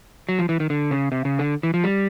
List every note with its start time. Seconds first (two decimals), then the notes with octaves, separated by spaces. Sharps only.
0.29 F#3
0.39 F3
0.49 E3
0.60 D#3
0.70 D3
0.91 C#3
1.12 C3
1.25 C#3
1.39 D3
1.63 E3
1.74 F3
1.84 G3